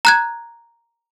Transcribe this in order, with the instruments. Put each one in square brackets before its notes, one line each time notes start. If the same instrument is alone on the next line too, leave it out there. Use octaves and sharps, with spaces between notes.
[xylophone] A#5 F#6 G#6